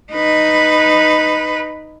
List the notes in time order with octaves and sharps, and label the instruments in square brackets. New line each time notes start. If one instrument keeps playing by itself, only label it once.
[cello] D#4 B4